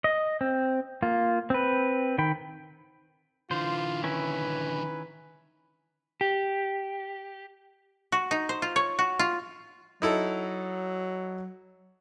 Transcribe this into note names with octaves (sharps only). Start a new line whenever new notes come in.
D#5
C4
A#3 F4
C4 B4
D#3 G5 B5
D3 E3 F4 C5
D#3 C#4 E4 B4
G4
F#4
D#4
C5
F4
C#5
F#4
F4
F#3 D#4 E4 A4